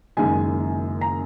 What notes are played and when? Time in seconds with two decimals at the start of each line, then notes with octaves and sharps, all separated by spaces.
0.17 F#1 F#2 D#3 G#3 G#5
1.01 A#5